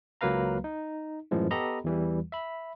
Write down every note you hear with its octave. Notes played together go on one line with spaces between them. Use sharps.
C#2 F#3 A#3 B4 F5 A#5
D#4
F#2 A2 E3 F3 G#3
B3 G4 A4 D#5 A#5 B5
E2 E3 G3
E5 B5